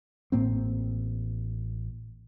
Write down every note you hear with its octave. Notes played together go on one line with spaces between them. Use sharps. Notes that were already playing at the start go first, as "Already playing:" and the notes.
A1 A2 A#3 C4